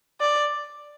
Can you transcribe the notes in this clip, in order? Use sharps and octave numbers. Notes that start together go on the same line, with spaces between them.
D5